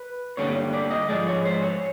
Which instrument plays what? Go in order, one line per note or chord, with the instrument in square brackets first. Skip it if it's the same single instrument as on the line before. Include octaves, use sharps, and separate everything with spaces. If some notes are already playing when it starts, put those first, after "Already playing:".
Already playing: [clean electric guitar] B4
G2 D3 G3 A#3 C#5
D5
D#5
G#2 F3 G#3 D5
C#5
C5
C#5